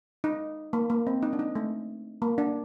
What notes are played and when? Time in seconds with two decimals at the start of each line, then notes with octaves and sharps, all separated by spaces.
0.24 D#4
0.73 A#3
0.90 A#3
1.07 C4
1.23 D#4
1.33 D4
1.39 D#4
1.55 A3
2.22 A#3
2.38 D4